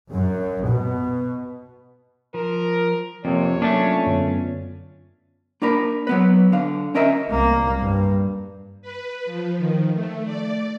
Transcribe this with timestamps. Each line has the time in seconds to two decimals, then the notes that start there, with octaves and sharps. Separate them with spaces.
0.12 F#2
0.66 B2
2.34 F3 A#4
3.25 F2 C3 A#3 C#5
3.62 F#3 A3 A#3 C#4 D4 F4 G#5
4.07 F#2 D3 B3
5.62 A#3 D4 A#4 B5
6.07 F#3 B3 B4
6.52 D3 F5
6.95 C#4 A#4 D#5 E5 A#5
7.30 C2 A#3
7.79 G2
8.82 B4
9.25 F3
9.58 D#3
9.94 A3
10.25 D5